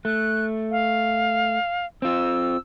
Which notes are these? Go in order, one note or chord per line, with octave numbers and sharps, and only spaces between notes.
A3 F#6
F5
C4 F4 E6